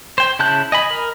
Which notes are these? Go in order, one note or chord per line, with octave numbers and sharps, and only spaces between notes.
C5 G5
C#3 E4 A5 F#6 G6
D#5 G#5 B5
A#4